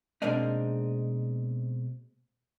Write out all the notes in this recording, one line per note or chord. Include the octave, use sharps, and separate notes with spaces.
B2 G#3 A#3 C4 D4 D#4